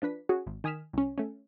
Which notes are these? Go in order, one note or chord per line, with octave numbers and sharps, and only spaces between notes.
F3 D4 B4 B6
C#4 F#4 G#4
G#1
D#3 G#5 D#6 F6 B6 E7
C2 C#4
A3 C#4